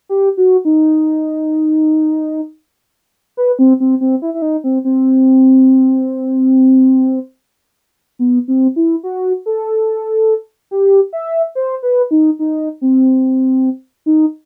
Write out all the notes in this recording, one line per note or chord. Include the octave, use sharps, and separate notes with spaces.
G4
F#4
D#4
B4
C4
C4
C4
E4
E4
D#4
C4
C4
B3
C4
E4
F#4
A4
G4
E5
C5
B4
D#4
D#4
C4
D#4